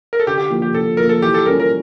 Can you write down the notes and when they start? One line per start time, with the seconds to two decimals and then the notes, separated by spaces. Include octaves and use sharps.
0.13 A#4
0.20 A4
0.27 D3 G4
0.38 G4
0.50 F3 A#3
0.62 G4
0.74 D3 A4
0.97 F3 A#4
1.03 A#3
1.09 A4
1.22 E3 G4
1.34 A4
1.46 G3 C#4 F4 A4 A#4
1.60 A#4